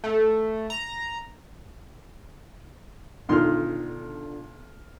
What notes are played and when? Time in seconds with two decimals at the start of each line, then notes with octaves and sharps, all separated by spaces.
0.04 A3
0.70 A#5
3.29 B1 D3 D#3 F4 C6 F6